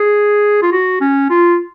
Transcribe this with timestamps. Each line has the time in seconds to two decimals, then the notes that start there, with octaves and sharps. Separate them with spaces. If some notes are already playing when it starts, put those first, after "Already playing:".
Already playing: G#4
0.62 F4
0.72 F#4
1.01 C#4
1.30 F4